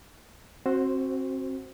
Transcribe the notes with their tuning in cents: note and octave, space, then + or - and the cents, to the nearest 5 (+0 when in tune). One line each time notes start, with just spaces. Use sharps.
C4 +30 F#4 +0 C5 +0